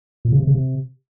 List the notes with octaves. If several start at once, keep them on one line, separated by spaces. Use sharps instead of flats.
A#2
C#3
C3
C#3
C3